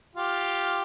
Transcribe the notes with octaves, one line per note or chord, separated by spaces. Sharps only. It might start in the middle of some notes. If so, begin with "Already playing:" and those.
F4 G4